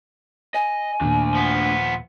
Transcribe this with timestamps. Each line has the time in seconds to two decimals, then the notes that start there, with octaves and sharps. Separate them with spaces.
0.54 D#5 G#5
1.01 D#2 A#2 A3 D4
1.35 F3 B3